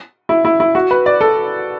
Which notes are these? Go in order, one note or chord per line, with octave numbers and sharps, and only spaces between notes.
E4
E4
E4
F#4
B4
D5
A4